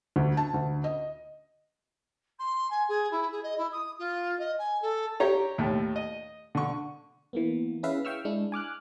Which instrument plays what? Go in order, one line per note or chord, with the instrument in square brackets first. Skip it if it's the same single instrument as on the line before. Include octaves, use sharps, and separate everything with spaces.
[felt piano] D2
A5
D2
D#5
[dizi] C6
G#5
G#4
E4
G#4
D#5
E4
D#6
F4
D#5
G#5
A4
[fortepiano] G4 C#5 A#5
D#2 A2
D#5
D3 C#6
[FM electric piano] E3 A#3 B3
C#4 E4 G#4 B4 E5 F5
E5 F5 G5 C#6 E6 F6
G#3 D4 E4
G#5 D6 F6 F#6